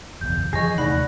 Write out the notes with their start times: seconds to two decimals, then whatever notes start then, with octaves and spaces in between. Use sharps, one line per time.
0.21 F#1 B1 E2 G6
0.53 D3 E3 F3 G#4 C#5 D#5 A#6
0.78 D#2 C3 A3 D#4 D5 F#5 B5 A#6